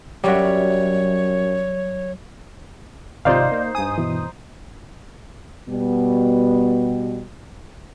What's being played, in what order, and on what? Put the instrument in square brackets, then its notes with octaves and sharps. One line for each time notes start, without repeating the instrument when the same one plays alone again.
[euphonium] F#2 [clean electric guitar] F#3 D5 E5 [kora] G3 F#4 [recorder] C#5
[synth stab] G#1 C3 F4 [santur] D#4 C5 [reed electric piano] D5 F5
[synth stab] A#3
[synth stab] G2 D#6 [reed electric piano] G#5
[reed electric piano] B2 E3
[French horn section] B2 G3 B3